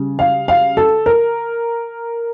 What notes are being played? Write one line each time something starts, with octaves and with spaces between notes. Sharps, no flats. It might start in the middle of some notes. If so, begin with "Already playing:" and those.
Already playing: C#3 G3
F5
F5
A4
A#4